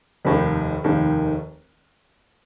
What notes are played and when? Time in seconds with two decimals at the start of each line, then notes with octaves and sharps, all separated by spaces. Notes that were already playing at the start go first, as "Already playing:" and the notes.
0.25 F1 D#2 D#3 B5
0.84 F1 D#2 D#3